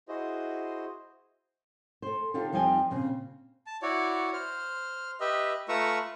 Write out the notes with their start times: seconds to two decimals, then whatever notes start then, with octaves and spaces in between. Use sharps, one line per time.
0.08 E4 F#4 G#4 C5 D#5
2.02 A4 C5
2.34 D3 D4 D#4 F4 G4 A4
2.52 F2 F3 G3 D#4 G5 G#5
2.90 A#2 C#3 C4
3.67 A5
3.82 E4 F#4 C#5 D5
4.33 C5 F6
5.20 G4 B4 D#5 E5
5.69 A3 F4 B4 A#5 C#6 E6